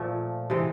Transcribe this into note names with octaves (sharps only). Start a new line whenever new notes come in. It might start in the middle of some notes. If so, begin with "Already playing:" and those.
Already playing: A#2 F3 A3
C3 E3 G#3